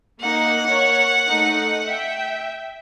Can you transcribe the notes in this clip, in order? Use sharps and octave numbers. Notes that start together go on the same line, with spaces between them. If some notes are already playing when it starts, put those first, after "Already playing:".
A#3 D#4 F#5
A#4 C#5
A3 D#4
E5 G5